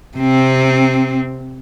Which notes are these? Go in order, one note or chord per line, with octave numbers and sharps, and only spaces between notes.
C3 C4